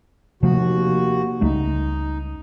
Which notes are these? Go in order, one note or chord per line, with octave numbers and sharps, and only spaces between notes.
D#2 C3 F3 A3 F#4
C#2 G3 A3 D#4